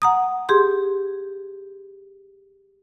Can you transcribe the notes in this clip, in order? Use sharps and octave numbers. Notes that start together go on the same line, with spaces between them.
F#5 A#5 D#6
G4 G#4 C6